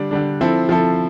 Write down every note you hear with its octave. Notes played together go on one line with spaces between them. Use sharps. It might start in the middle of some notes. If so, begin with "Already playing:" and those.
Already playing: D3 G3 D4
D3 G3 D4
F3 C4 E4 A4
F3 C4 E4 A4